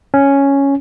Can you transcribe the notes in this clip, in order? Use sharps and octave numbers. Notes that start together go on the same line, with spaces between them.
C#4